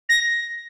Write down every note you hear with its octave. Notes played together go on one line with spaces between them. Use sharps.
A#6